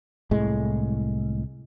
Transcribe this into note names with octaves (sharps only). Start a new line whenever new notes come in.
C2 A2 G#3